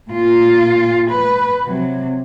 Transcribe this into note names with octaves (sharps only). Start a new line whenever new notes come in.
A#2 F4
B4
C3 F#3